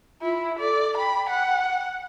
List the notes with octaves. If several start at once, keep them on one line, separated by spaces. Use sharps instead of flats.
E4 F4
A4 D5
G5 B5
F#5